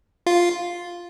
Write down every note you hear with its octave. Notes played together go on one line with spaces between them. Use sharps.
F4